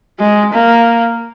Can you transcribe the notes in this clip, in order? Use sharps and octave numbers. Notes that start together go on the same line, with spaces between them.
G#3
A#3